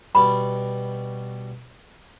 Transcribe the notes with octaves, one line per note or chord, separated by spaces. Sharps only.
B2 G3 B5